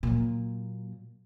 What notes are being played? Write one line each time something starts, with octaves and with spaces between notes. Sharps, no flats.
A#2 F#3